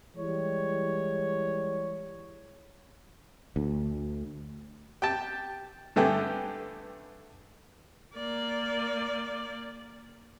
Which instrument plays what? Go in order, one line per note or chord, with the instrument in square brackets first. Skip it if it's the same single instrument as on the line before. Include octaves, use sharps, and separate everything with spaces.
[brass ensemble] E3 G3 G#3 C#5
[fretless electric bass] D2
[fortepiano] G4 G5 A5
G2 D3 A3 B3 G4 G#5
[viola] A#3 D5